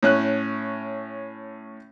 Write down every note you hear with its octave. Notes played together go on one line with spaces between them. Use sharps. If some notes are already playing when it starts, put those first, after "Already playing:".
A2 C#4 F#6